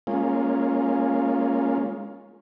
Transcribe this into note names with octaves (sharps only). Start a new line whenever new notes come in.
G#3 A#3 C#4 F4